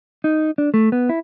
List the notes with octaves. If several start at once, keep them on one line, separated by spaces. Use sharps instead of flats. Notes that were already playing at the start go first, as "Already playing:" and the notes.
D#4
D4
A3
B3
E4